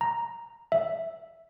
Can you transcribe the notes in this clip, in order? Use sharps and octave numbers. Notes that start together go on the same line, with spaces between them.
A#5
E5